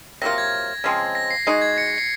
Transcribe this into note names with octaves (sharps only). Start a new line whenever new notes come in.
C3 F#3 A#3 F4 A#6
G#6
C#3 F3 G#3 C4
A#6
C7
G#3 D#4 F#4 C7
G#6
A#6 C#7
C7
C7